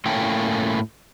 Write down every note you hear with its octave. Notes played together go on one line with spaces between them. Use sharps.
A2 A3 A#3 C#4 G5